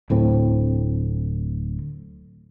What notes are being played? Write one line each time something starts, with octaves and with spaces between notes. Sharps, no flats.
D1 A2 C4